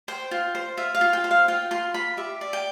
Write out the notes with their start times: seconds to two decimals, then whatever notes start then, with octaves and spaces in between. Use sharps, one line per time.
0.08 C5 G5
0.31 F4
0.55 C5
0.77 F4 E5
0.95 F5
1.01 F4
1.13 G5
1.24 C5
1.31 F5
1.48 F4 G5
1.71 F4 C6
1.94 F4 B5
2.17 G4 E5
2.41 D5
2.53 G5